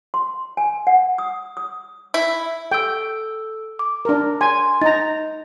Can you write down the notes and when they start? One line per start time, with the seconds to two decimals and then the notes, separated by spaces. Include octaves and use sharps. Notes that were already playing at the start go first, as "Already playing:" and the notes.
0.14 C6
0.57 G#5
0.87 F#5
1.18 D#6
1.57 D#6
2.14 E4
2.72 A4 G5 E6
3.79 D6
4.05 D4 A#4
4.41 G#5 C6
4.81 D#4 A#5 A6